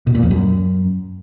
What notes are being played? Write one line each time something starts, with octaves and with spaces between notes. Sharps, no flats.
B2
A#2
F2
F#2